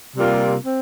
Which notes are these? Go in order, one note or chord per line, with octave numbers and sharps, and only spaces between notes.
C3 G3 A#3 F4
C4